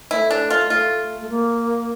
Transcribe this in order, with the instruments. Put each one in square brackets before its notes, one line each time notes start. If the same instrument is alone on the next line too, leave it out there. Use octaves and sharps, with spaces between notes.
[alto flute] A3 [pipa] E4
[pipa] D4
F4
[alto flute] A3 [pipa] F4
[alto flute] A3
A#3